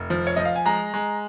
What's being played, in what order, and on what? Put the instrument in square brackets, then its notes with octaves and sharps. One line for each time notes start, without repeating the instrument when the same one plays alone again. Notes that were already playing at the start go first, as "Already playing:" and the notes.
Already playing: [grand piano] F1
F3
C#5
F3 D#5
F5
G#5
G#3 A#5
G#3